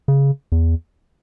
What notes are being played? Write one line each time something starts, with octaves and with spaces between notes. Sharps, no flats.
C#3
E2